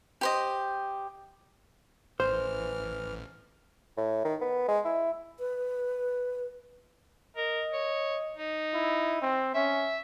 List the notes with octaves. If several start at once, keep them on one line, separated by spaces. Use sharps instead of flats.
G4 C5 D#5
A1 E3 C5 F6
A2
D#3
B3
G#3
E4
B4
A#4 D#5
C#5
D#4
E4
C4
C#4 E5